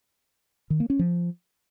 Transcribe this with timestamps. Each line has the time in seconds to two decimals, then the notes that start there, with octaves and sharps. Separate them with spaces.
0.70 D#3
0.80 A#3
0.90 C#4
0.99 F3